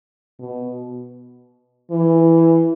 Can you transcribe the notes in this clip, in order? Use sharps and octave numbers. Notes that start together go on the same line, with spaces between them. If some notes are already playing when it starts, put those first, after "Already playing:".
B2
E3